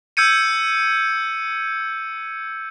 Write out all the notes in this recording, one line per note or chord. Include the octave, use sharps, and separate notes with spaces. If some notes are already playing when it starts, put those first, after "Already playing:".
E6 G6 G#6 C#7 D#7